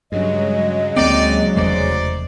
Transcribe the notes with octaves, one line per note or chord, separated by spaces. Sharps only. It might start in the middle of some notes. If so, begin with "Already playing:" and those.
G2 C#3 F#3 G#3 D#5
D2 A#3 C4 D#4 G4 D5
F1 E2 A3 D#4 C5 D5